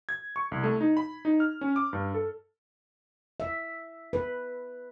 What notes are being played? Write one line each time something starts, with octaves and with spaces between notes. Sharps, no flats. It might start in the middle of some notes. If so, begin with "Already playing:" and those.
G#6
C#6
C2
A3
D#4
B5
D#4
F6
C#4
D6
G2
A4
E5
B4